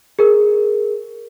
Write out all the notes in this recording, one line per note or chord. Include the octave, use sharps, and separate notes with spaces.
G#4 A#4